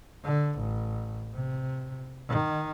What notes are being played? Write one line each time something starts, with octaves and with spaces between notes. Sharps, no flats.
D3
A1
C3
D#3